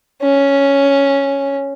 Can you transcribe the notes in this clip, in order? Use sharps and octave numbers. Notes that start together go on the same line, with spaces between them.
C#4